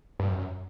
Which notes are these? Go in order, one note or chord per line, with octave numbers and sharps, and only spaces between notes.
G2
F#2
F#2